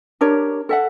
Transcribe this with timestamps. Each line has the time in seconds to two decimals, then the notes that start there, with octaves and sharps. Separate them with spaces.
0.21 D4 G4 A#4 C#5
0.69 A4 E5 F#5